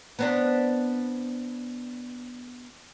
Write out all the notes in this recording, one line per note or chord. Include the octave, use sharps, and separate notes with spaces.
B3 C4 D4